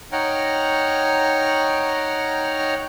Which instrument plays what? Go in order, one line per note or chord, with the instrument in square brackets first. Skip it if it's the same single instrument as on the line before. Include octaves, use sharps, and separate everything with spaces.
[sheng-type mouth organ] D#4 C#5 F#5 G5 A#5 F6